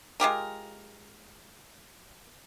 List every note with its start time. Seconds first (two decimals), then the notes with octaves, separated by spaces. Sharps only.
0.20 G#3 F4 G4 A#4